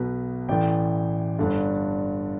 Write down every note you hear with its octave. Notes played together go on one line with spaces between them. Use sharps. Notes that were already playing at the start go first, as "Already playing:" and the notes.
Already playing: B1 B2 B4
A1 A2 E3 D5 G5
G1 G2 D3